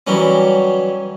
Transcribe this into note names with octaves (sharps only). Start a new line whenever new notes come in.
E3 F#3 G3 C#4